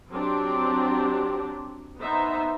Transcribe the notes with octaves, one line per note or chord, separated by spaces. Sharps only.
F#3 C4 D4 G4
B3 D#4 C5 E5